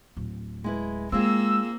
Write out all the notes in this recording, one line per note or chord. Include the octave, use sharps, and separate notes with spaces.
D1
G#3 E4 B4
G#3 A#3 C4 F4 G#4 E6